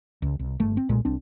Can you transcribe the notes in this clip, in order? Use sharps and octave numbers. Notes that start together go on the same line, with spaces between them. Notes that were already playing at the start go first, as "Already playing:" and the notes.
C#2
C2
G1 A3
C4
B1 A#2 G#3
C2 C4 D4